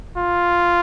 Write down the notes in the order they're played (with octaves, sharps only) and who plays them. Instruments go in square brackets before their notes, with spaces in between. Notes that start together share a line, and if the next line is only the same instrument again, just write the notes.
[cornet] F4